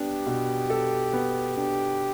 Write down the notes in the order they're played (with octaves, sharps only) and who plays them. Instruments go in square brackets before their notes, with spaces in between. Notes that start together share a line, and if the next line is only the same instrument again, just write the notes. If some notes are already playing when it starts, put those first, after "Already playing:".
Already playing: [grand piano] B3 D4 [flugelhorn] G4
[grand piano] B2
A4
B3
[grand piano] D4 [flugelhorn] G4